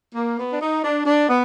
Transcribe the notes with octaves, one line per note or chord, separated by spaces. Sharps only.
A#3
B3
D4
D#4
D4
D4
B3